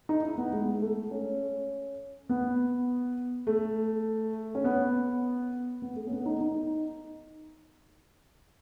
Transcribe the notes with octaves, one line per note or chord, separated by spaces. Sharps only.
D#4
E4
B3
G#3
A3
C#4
B3
A3
C#4
B3
B3
A3
C#4
B3
D#4
D#4